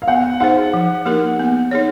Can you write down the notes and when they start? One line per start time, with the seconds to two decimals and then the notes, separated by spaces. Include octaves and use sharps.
0.02 F5
0.08 B3 F#5
0.40 D#4 G#4 C5 F#5
0.74 F3
1.05 A#3 D#4 G4 A#4
1.39 B3
1.71 D#4 G#4 C#5